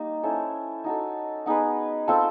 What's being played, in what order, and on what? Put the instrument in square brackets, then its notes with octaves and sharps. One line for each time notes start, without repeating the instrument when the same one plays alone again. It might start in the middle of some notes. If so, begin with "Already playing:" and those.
Already playing: [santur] G3 A#3 D#4
C#4 E4 A4 C5
D#4 F#4 A4
B3 D#4 G#4 B4
C4 F4 A4